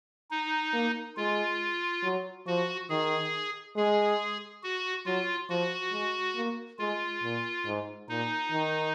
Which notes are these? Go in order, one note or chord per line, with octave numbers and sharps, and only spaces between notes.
D#4
A#3
G#3 F4
F#3
F3 F#4
D#3 G#4
G#3 G#4
F#4
F#3 F4
F3 F#4
G#3
A#3
G#3 F4
A#2
G#2
A#2 D#4
D#3